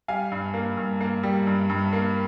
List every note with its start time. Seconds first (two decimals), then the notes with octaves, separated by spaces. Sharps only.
0.08 G3 F5 G#5
0.32 G2
0.54 A#3
0.77 G2
1.01 A#3
1.23 G3
1.47 G2
1.69 G2
1.93 A#3